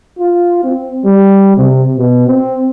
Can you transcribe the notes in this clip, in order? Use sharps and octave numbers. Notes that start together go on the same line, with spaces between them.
F4
C4
G3
C3
B2
C4